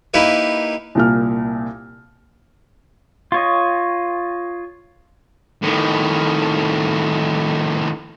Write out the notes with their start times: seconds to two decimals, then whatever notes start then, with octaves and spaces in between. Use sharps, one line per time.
0.14 A#3 D#4 E4 G4 B4
0.95 C2 A#2 F6
3.32 F4 C#5 D#5
5.62 A2 D#3